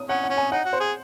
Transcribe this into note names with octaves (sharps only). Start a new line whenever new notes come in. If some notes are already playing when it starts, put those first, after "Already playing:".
Already playing: D#6
C#4 F#5
F#5
C#4
G#5
D#4 F#5
F#4
C5
G#4